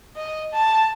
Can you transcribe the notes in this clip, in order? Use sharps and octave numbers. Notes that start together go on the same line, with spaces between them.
D#5
A5